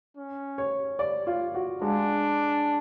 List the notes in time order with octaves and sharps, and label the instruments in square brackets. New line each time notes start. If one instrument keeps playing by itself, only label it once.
[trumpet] C#4
[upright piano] C#5
D5
F4
F#4
[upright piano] G#3 [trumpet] D4